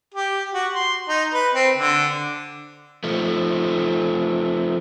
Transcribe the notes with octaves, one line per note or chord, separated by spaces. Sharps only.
G4
F#4
C6
D#4
B4
C4
D3
F3 A3